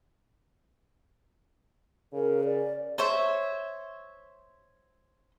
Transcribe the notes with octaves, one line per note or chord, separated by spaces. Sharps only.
C#3 A#4
D5
C5 C#5 E5